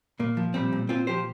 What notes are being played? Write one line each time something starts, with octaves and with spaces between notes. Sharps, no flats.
A#2 A#3
F3
A#2 G3 C4
A#2
A#2 C4 F4
F3 G4 C5